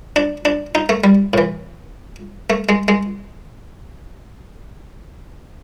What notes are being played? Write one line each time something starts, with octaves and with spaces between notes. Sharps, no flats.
D4
D4
D#4
A3
G3
A2 E3
A3
G#3
G#3